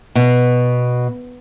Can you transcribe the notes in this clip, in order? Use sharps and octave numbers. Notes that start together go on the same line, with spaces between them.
B2